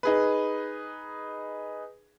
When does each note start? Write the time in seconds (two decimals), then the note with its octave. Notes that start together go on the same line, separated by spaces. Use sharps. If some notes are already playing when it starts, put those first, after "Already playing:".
0.03 D#4 G#4 B4